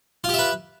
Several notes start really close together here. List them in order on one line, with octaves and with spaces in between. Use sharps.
F4 G4 E5 B4